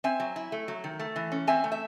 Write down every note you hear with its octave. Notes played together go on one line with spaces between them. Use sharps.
C4 E5 G#5
F#3
E4
A3
F#3
D#3
A3
E3
C#4
C4 E5 G#5
A3
E5